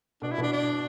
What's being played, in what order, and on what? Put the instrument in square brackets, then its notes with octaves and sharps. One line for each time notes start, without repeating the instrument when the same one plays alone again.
[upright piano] B2 [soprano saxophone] D4
[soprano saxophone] E4
[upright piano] B2 E3
[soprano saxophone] D4
D4